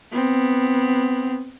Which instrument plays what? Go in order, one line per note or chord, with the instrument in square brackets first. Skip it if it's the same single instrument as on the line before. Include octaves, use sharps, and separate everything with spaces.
[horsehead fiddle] B3 C4